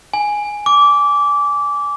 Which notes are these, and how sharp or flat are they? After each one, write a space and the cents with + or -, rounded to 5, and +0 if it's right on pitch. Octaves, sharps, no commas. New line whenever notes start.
G#5 +0
D6 -20